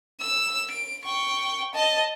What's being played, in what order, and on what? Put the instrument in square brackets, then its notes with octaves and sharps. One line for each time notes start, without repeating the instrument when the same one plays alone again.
[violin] E6
D7
G5 C#6
D#5 A5